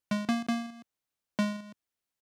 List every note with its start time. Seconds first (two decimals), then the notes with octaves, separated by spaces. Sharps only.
0.11 G#3
0.29 A#3
0.48 A#3
1.39 G#3